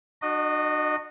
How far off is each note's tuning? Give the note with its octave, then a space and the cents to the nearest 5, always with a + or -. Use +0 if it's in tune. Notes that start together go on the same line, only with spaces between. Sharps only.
D4 +40 F#4 -5 D#5 -20